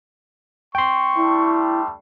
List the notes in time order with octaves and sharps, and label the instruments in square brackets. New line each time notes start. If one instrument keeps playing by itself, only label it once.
[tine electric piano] G5 C6 [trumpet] C#6
[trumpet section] G3 A3 D4 [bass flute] E4